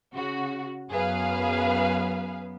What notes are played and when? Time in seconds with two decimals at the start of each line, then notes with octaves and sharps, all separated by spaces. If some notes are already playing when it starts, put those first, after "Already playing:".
0.14 C#3 F#4
0.91 F#2 B3 G#4 B4 F5